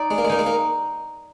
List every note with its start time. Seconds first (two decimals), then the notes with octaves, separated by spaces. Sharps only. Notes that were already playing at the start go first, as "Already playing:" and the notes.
Already playing: D#4 D5
0.11 G#3
0.18 A#3
0.25 G#3
0.29 A#3 D#4
0.39 G#3
0.46 A#3